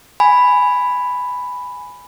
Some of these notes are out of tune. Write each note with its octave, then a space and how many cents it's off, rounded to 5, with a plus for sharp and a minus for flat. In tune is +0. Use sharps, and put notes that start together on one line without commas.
G#5 +0 B5 +5